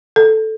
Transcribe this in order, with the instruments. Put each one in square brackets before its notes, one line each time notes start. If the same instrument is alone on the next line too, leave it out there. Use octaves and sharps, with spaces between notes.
[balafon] A4